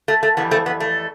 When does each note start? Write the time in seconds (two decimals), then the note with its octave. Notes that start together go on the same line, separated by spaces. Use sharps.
0.08 A3
0.23 A3
0.37 F2 E3 G3 B3
0.51 A3 C4
0.66 B3
0.80 A3